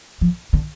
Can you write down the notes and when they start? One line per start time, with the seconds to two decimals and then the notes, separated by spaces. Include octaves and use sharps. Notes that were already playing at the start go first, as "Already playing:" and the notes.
0.21 F3
0.53 D3